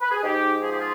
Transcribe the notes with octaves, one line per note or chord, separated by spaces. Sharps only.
B4
G#4
G#2 D#4 G4
F3 G#4
G4
F4 G#4